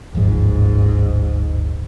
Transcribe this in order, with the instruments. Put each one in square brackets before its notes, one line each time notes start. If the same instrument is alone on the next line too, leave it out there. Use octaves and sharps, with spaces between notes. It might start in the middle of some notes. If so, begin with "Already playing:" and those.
[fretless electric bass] D1 G1 F3 [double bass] G#2